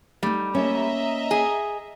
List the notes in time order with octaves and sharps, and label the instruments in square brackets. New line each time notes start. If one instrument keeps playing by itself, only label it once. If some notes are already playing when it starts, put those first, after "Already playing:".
[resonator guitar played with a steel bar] G3 [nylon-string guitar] A3 D#4
[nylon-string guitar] A#3 C#4 [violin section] D#5 E5 A#5
[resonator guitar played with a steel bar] G#4